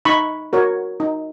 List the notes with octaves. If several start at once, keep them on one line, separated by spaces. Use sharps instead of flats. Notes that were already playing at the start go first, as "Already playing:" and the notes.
D#4 B5 C#6
F#4 A#4 C#5
D#4